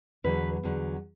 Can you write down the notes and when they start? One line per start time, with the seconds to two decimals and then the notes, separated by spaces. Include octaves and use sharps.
0.24 E2 D3 F#3 B4
0.63 E2 D3 F#3